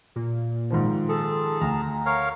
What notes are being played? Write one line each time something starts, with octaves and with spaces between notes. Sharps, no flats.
A#2
G#2 D#3 F3
G#4 A4 A5
D2 A#5
A#4 C#5 F5